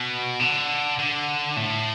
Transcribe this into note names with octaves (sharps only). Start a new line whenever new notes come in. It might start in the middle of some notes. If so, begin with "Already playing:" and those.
Already playing: B2
D3
D3
A2